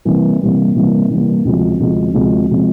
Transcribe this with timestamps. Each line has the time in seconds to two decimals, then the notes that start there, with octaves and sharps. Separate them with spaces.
0.05 C3 E3 G3 A#3
0.40 C3 E3 G3 A#3
0.75 C3 E3 G3 A#3
1.09 C3 E3 G3 A#3
1.45 D2 C3 F3 G#3
1.80 D2 C3 F3 G#3
2.14 D2 C3 F3 G#3
2.50 C3 F3 G#3